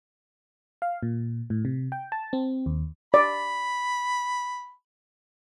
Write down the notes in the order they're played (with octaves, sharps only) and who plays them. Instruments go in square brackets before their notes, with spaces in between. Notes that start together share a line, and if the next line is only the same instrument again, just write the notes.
[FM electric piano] F5
A#2
A2
C3
G5
A5
C4
D#2
[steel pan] D5 [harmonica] B5